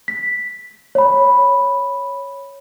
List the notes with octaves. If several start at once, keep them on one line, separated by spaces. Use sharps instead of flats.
B6
C#5 B5